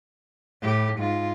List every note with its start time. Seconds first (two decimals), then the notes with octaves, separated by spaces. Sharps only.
0.62 A2 G4
0.98 G#2 F4